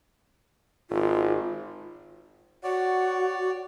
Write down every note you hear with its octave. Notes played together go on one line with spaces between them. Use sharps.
G#1 F4
F#4 C#5 D5 F#5